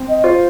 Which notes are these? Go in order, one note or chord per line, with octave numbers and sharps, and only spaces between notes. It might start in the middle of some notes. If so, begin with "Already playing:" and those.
Already playing: C4
D#5
F4 C5